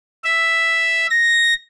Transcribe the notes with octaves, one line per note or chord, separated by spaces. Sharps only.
E5
A#6